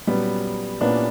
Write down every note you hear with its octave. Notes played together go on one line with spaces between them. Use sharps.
A#2 F#3 G3 B3 C#4
A#2 A#3 B3 C#4 D4 E4 B4